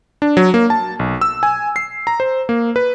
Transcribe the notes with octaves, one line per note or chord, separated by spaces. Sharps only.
D4
F#3
A#3
A5
B1
E6
G#5
C7
A#5
C5
A#3
B4